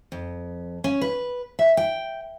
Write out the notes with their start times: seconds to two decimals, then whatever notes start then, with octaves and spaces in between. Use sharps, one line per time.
0.12 F2
0.84 C#4
1.01 B4
1.59 E5
1.77 G5